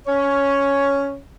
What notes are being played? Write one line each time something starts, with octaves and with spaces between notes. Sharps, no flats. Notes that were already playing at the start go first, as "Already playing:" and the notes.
C#4 C#5